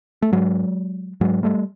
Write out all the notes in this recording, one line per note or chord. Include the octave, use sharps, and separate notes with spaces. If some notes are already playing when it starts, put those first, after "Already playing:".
A3
G#2 F#3 G#3
G#2 F#3 G#3
G3 A3